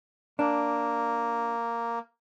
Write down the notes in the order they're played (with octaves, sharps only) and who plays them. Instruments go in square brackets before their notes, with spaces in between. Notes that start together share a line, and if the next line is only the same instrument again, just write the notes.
[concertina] A#3 [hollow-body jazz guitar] D4